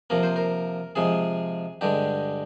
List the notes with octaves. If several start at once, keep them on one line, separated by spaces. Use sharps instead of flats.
C3 F3 A#3 A#4
C5
A#4
C3 F3 G#3 G#4
G2 D3 G#3 G4